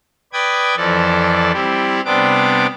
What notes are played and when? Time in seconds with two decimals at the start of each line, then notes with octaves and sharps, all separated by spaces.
0.33 B4 D5 G5 D#6 G#6
0.76 F2 E3 F3 A4 D5
1.53 G3 C4 E4 G4
2.05 C3 G3 B3 C4 D4 D6